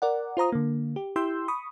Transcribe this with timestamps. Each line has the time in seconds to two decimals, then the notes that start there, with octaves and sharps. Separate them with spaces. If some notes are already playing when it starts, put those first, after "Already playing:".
0.02 A#4 D5 F#5
0.37 F4 C5 A#5 D#6
0.52 D3 A#3
0.96 G4
1.16 E4 G4 C6 E6 G6
1.48 B5 C#6 D#6